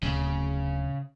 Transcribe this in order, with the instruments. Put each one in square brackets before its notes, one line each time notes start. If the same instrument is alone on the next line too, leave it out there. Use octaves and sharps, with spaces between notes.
[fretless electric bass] D1 [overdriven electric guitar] C#3